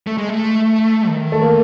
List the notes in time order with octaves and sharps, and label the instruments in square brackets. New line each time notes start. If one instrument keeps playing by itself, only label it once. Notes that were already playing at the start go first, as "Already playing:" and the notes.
[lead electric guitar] A3
G#3
A3
D#3
[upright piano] A3
A#3